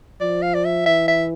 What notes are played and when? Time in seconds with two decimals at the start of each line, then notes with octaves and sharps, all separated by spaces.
0.21 F3 D5
0.42 F5
0.54 D5
0.65 E5
0.86 E3 E5
1.08 E5